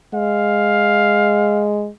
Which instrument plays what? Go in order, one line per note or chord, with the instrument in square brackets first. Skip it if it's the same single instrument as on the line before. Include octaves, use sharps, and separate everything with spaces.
[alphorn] G#3 [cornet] F5